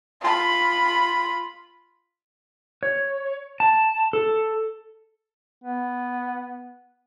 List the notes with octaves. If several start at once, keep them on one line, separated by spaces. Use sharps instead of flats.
F4 B5
C#5
A5
A4
B3